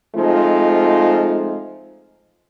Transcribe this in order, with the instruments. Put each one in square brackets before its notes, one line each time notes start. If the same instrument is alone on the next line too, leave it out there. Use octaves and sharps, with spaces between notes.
[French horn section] F3 G#3 A3 C4 D#4 F4